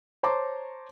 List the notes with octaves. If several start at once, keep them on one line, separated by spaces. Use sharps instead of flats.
C5 C#5 A5 A#5 C6 D6